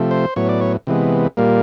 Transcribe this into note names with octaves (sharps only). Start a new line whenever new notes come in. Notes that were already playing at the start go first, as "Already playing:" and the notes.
Already playing: C3 F3 A3
C5
A2 F#3 B3 C#5
D5
C#5
C3 E3 G#3 B3
A#2 G3 A#3